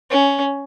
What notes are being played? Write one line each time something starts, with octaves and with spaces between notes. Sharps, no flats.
C#4